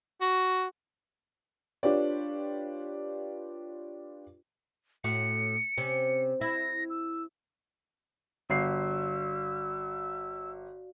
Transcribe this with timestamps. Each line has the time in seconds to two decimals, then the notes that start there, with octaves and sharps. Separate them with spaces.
0.21 F#4
1.83 D4 F4 G4 B4 C#5 D5
5.04 A2 C#4 F#4 C#7
5.78 C3 C#4
6.41 E4 A#6
6.90 E6
8.50 G1 F#4 D5 F5 E6 C7